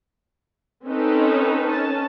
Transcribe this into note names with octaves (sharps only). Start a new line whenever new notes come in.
C4 C#4 D#4 A4 B4
C#4 A5